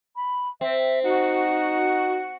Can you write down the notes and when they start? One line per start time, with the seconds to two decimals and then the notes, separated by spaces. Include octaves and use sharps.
0.16 B5
0.61 C4 E5
1.04 D#4 F#4 F#5